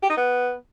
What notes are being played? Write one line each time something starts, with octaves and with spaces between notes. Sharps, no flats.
G4
D#4
B3